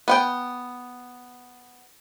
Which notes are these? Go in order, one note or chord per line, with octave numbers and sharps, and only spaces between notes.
B3 F#5 G5